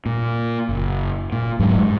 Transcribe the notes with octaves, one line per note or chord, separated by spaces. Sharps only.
A#2
F#1
A#2
F1 G#2 F#3 G#3
G#2